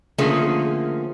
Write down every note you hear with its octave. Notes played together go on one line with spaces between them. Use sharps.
D3 F3 A3 A#3 C#4 G#4